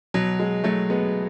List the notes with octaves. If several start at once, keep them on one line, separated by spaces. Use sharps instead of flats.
B2 F#3
G#3
F#3 A3
G#3 B3